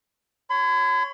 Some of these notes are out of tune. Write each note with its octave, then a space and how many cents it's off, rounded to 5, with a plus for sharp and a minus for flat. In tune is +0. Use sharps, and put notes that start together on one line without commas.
C#5 +0 B5 +45